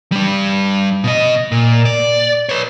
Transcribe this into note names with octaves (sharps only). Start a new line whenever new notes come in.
G3 D4
B2 D#5
A#2
D5
B4 C#5